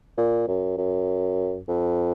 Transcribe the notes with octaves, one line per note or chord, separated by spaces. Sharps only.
A#2
F#2
F#2
F2